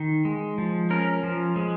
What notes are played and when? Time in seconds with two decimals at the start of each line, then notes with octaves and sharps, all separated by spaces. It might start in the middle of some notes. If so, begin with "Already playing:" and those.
Already playing: D#3
0.25 G#3
0.58 F3
0.90 C#4 A#4
1.23 F3
1.56 G#3